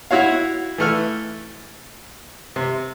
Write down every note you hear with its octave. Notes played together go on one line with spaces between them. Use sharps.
E4 F#4 C#5 F5
E3 A3 F6
C3